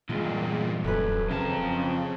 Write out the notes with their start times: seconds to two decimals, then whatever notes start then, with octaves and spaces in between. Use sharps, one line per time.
0.09 E2 G2 A#2 G#3 F4
0.84 D#1 F#2 A4 B4
1.31 F2 C#3 C4 F5 A5 A#5